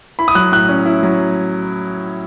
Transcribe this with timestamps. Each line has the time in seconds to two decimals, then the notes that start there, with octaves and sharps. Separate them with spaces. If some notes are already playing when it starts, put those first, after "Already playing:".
0.19 E4 B5
0.28 D#6
0.35 F#3 F#6
0.52 A2 F#6
0.69 C#4
0.86 E4
1.03 F#3